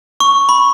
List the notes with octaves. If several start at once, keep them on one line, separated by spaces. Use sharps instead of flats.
C#6
B5